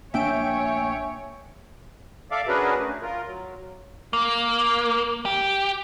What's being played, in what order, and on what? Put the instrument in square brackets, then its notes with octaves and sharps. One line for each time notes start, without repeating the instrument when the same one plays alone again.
[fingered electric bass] A#1 A#3 D4 [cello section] C#5 [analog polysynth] E5 G5 D7 [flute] G#5
[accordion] A4 D5 E5 F5 D6
C#4 D4 F#4 G#4 A#4 B4
A3
F4 A#4
F#3
[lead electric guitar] A#3
G4